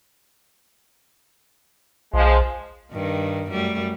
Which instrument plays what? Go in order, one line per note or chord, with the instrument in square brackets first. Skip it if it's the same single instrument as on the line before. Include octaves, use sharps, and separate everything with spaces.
[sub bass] B1 [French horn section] F3 G#3
[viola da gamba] G2 D#3
F#2 G3 A3